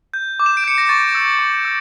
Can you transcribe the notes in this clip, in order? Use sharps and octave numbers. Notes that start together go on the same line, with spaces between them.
G6
D6
E7
D7
G6 C#7
A#6
C#6 A6
E6 G6
C#6
E6